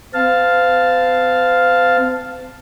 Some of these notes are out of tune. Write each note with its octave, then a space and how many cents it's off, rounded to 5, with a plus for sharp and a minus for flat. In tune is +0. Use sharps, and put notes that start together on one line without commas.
C4 -40 F5 +0 A5 +0